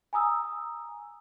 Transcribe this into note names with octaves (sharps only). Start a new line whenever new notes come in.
G#5 A#5 D#6 E6